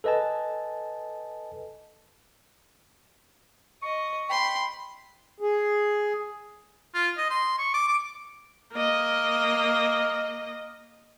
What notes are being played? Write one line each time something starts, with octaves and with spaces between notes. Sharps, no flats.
A4 B4 D#5 G#5 A5
D#5 C#6
G5 B5 C6
G#4
F4
D#5
C6
C#6
D6
D6
A#3 D#5